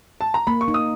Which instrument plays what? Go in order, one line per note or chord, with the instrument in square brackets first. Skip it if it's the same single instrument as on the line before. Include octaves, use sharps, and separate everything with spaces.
[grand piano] A5
A#5
[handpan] A#3 [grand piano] B5
[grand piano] C#6
[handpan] D#4
[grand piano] D#6